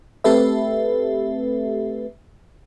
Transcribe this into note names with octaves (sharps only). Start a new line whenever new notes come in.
A3 C4 G4 A4 B4 E5